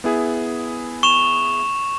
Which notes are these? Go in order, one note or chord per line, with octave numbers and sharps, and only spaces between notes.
B3 E4 G#4
C#6 E7 F7